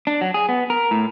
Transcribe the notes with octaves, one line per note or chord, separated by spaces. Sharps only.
D4
F#3
G#4
B3
A#4
A2